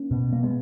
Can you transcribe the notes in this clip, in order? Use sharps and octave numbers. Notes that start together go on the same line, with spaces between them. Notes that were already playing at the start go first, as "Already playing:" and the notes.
Already playing: A#3 C#4
B2
A#3
G#3 B3